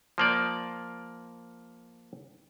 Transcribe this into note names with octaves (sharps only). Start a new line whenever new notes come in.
F3 A#3 D5